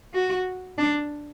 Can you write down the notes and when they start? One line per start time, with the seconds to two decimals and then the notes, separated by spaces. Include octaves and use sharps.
0.14 F#4
0.78 D4